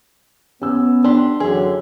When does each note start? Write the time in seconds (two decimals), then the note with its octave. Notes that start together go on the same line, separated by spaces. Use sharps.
0.62 B3 C#4 E6
1.04 D4 G4 C6
1.40 F#2 D3 E3 G4 G#4